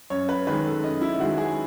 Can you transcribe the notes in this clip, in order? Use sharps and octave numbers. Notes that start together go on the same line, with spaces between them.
F#2 C#5
B4
D#3 G#3 B4
A4
F#2 D#5
E4
D#3 G#3 F#4
G#4